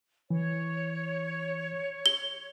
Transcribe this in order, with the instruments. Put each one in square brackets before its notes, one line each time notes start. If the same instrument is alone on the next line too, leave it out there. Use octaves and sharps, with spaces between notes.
[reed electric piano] E3 [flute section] C#5
[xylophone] G7